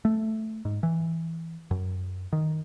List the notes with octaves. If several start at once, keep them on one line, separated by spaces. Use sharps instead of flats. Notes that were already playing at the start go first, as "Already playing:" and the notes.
A3
G#2
E3
F#2
D#3